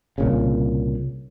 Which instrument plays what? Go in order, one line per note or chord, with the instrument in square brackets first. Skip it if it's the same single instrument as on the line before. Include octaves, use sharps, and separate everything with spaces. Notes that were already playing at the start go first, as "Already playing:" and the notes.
[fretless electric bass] C2 A#2 C#3